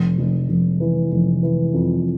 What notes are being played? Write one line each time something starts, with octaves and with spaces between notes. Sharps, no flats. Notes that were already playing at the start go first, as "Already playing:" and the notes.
Already playing: F1
F1
F1
E3
F1
E3
F2